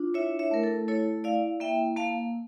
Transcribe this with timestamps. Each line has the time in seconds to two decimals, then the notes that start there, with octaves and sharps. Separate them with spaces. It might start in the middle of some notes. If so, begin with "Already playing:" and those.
Already playing: D4 F4
0.14 E4 C#5 E5
0.39 C#5 E5
0.51 A3 A#4
0.63 A4
0.88 E4 A4 C#5
1.24 E4 D5 F5
1.60 A#3 E5 G5
1.96 A#3 F5 A5